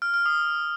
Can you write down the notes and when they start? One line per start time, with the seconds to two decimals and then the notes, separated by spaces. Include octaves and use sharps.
0.02 F6
0.14 F6
0.26 D#6